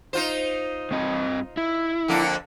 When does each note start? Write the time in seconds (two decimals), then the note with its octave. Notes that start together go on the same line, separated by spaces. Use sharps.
0.13 D#4 F4 C5
0.91 G2 C4 D#5
1.57 E4
2.08 F2 D3 A#3